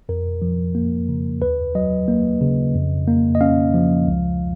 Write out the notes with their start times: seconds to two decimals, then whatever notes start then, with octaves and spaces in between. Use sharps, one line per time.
0.09 F2 A#4
0.42 F3
0.75 A#3
1.08 C#3
1.42 D#2 B4
1.75 F#3 D#5
2.08 A#3
2.41 C#3
2.75 F2
3.08 A#3
3.35 D#5
3.41 C#4 F5
3.74 F3
4.07 C#2